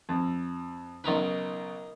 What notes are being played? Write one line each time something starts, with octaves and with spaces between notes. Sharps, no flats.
F2
B1 C#3 D#4 A#4 B4